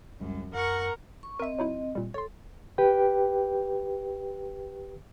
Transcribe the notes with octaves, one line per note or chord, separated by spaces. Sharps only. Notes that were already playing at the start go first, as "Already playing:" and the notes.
C#2 F#2 G3 G#3
F#2 A#4 F#5 C#6
C#6
C4 A#4 D#5 E5
F#3 D#4 E4
A#2 G3
A4 C#5 C6
G4 B4 G5